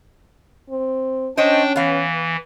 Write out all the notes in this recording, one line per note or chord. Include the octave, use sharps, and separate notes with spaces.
C4
C#4 D4 C5 C#5 D#5 G5
E3 B3 F5